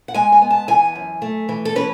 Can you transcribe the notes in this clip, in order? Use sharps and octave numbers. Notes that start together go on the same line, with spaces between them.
F#5
G#3 G#5
G#5
B3
A5
E3 G#5
F#2
A3
E3
A4
C#4 B4